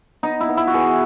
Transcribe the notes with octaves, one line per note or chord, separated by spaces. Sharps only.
B3 D#4
E4
B3
E4
F#4
E3 G#4